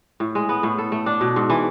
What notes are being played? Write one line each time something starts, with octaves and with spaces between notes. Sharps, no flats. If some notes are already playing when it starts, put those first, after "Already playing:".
A2
G#3
B3
A2
A4
A3
D4
B2
G#2
E3